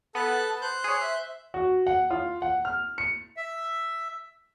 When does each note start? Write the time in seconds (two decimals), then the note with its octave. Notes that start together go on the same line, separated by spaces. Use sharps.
0.15 B3 A4 A5 F#6
0.50 A5
0.61 C5 F#6 G6
0.84 G#4 C#5
1.01 E5
1.54 F#4
1.87 F#5
2.11 F4
2.42 F#5
2.65 F6
2.98 C#7
3.37 E5